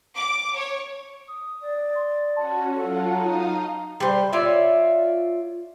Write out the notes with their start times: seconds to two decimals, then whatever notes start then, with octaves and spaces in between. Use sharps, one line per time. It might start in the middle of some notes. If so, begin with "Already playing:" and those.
0.15 D6
0.55 C#5
1.28 D#6
1.62 D5
1.95 C6
2.37 C#4 F#4 A5
2.75 F#3 F4 F#4 A4
3.14 D#4 D#5 F5 A#5
4.00 G3 C5
4.33 F4 C#5 D5 E5